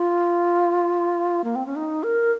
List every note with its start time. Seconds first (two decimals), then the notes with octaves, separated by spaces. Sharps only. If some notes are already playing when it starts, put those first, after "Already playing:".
Already playing: F4
1.44 A#3
1.56 C4
1.66 C#4
1.76 D#4
2.03 A#4